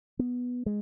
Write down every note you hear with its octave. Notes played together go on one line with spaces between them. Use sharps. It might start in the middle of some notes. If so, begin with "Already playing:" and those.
B3
G#3